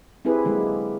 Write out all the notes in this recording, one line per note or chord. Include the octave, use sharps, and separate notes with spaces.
C4 E4 G4 G#4 B4
D3 F#3 G#3 A#3